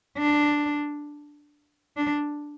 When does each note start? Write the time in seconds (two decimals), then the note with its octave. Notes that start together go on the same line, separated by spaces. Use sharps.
0.18 D4
1.97 D4